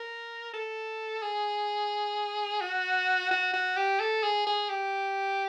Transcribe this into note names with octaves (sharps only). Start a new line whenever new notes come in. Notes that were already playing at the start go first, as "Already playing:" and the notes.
Already playing: A#4
A4
G#4
F#4
F#4
F#4
G4
A4
G#4
G#4
G4